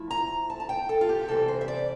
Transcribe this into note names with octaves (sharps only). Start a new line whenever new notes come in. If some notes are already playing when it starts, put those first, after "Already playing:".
Already playing: F3 A3 E4
A#5
A5
A5
G5
A4
F4
G4
C3 E3 G3 C4 A4
C5
E5
D5